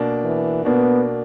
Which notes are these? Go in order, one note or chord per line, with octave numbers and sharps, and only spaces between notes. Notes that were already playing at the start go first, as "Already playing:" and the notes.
Already playing: B2 A#3 D4
E3
B2 A#3 B3 D4